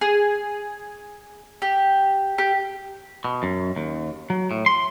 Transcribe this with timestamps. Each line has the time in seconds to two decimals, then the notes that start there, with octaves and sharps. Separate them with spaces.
0.01 G#4
1.62 G4
2.38 G4
3.25 B2
3.43 F#2
3.76 D#2
4.30 F#3
4.51 A2
4.66 C6